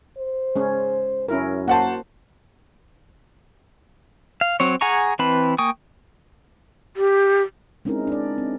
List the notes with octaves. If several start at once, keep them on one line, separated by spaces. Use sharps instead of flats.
C5
G#3 C#4
F#2 C#4 E4 A#4
A#3 F#4 C5 F#5 A5
F5
F#3 C4 C#5
G#4 F#5 G#5 A#5 C#6
E3 C4 B4 A5 B5
A#3 G5 G#5 C#6 D#6
G4
G#3 C4 C#4 D#4 E4 A#4
D4 D5
C4